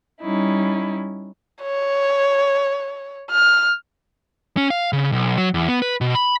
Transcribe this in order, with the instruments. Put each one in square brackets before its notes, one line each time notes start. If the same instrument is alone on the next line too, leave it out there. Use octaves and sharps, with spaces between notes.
[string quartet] G3 C#4 D#4 E4
[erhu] C#5
F6
[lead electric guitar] C#4
F5
C#3
B1
F#3
E2
B3
B4
B2
B5